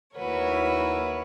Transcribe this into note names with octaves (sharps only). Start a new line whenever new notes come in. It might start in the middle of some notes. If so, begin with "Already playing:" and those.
D#2 E4 F#4 A#4 B4 C#5